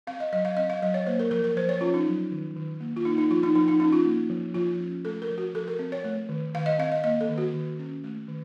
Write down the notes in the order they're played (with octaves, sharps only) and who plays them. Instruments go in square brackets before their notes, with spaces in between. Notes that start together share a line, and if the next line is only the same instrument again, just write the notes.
[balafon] C4 F5
D#5
F#3 D#5
F5
C4 D#5
F5
F#3 D#5
C#5
A#3 C5
A#4
F3 A#4
A#4
F3 C5
C#5
C#4 F4
D#4
F#3
D#3
D#3
A#3
F4
A#3 D#4
D#4
F3 F4
D#4
F3 D#4
D#4
C#4 D#4
F4
A#3
F3
F3 F4
C#4
A3 A4
A#4
F3
F#4
F3 A4
A#4
C4
C#5
A3
D#3
D#3 F5
D#5
C4 F5
D#5
A#3 D#5
A4
D#3
F#4
D#3
C#4
A3
D#3